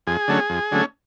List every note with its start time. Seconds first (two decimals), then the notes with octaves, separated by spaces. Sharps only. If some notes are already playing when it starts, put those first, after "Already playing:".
0.07 F2 G#4
0.28 D3 F#3 A3 C#4
0.50 F2
0.72 D3 F#3 A3 C#4